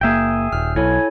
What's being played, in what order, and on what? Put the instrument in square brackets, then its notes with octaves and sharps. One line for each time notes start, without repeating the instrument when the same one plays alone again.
[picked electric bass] F#1 A#3 [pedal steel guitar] G#4 E5 G5
[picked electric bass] D#1 [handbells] F6
[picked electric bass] B1 [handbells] E4 A4 C#5 [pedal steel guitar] G#5